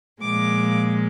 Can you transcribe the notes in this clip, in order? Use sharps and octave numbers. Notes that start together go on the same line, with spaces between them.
A#2 F3 G#3 D6